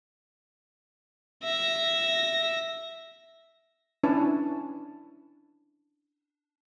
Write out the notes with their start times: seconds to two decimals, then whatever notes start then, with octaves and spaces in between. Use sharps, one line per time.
1.44 E5 A#6
4.03 C#4 D4 E4 B4 A5